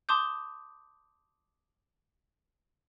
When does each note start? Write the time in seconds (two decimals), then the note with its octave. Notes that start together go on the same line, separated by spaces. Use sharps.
0.09 A5 C6 D6 D#6 G6